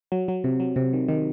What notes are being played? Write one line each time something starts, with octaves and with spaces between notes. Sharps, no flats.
F#3
F#3
C3
F#3
C3
D#3
D#3